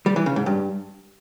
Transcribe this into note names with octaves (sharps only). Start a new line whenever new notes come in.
G3
E3
C#3
G#2
G2